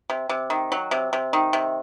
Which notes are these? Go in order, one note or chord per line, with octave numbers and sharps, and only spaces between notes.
C3
C3
D#3
F#3
C3
C3
D#3
C3